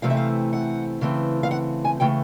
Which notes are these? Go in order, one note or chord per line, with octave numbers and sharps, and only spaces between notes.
C3 E3 A3 C4 F5
E5
F5
F#5
C#3 E3 A3 C4
F5
F#5
G#5
C#3 E3 A3 G5